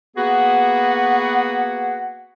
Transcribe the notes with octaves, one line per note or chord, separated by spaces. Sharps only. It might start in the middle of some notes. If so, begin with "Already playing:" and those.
A#3 B3 F#4 G#4 B4 F#5